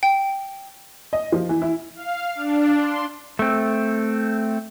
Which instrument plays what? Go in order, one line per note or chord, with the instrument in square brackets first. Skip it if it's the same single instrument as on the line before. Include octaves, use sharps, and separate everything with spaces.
[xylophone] G5
[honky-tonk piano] D#5
F3
E3
E4
[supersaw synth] F5
D4
C6
[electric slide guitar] A3 C4